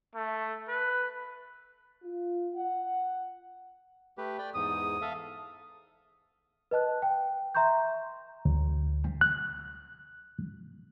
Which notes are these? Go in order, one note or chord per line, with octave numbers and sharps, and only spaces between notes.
A3
B4
F4
F#5
A3 G4 B4
D5 G5
E2 G#2 D#6
A4 E5 F5
B4 D#5 A5 F#6
G5
E5 A#5 C6 C#6 G6
D2
F#6